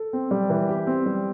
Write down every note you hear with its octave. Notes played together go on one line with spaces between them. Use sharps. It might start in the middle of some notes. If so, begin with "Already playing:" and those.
Already playing: A4
C4
G3
E3
G4
C4
G3